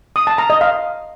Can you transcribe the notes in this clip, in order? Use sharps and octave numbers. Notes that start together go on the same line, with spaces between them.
D#6
A5
A#5
D#5
F5